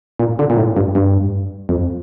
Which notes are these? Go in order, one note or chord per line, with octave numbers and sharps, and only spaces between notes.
A#2
D3
A#2
A2
G2
G2
F2